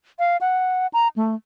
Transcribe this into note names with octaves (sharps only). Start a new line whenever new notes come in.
F5
F#5
A#5
A3